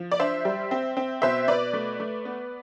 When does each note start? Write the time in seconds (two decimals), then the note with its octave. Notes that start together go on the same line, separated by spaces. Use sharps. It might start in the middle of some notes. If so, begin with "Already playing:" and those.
Already playing: F3
0.12 D5
0.20 D4 C5 E5
0.45 G3
0.71 C4
0.97 C4
1.22 B2 C5 E5
1.48 B2 B4 D5
1.73 A3
2.00 A3
2.25 B3